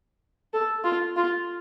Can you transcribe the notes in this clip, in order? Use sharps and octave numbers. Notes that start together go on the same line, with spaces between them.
A4
F4
F4